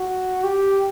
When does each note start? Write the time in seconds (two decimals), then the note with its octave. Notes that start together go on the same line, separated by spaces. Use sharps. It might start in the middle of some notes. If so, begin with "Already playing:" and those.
Already playing: F#4
0.44 G4